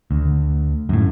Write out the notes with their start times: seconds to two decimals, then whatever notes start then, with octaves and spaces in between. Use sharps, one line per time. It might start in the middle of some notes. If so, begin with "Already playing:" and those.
0.11 D2
0.89 F#2 A2